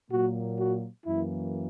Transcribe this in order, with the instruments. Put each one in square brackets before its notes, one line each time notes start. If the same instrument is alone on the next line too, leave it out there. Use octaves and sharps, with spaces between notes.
[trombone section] A#2 F#3 A#3 F#4
F#4
F#2 E3 A#3 E4